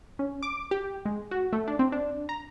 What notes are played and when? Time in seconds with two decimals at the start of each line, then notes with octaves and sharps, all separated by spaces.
0.19 C#4
0.43 D6
0.71 G4
1.05 G#3
1.31 F#4
1.53 A3
1.68 D4
1.79 C4
1.92 D4
2.29 A#5